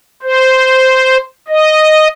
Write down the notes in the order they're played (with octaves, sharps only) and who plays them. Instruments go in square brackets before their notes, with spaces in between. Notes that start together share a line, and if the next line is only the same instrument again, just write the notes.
[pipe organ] C5
D#5